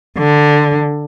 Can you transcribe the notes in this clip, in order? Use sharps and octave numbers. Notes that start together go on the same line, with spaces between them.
D3